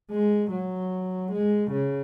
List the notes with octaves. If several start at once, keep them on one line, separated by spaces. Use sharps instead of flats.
G#3
F#3
G#3
C#3